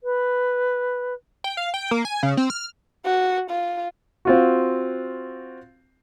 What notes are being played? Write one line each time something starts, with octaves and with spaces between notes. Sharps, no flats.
B4
G5
F5
G5
A#3
G#5
C#3
C4
F6
F#4
F4
C4 F4 F#4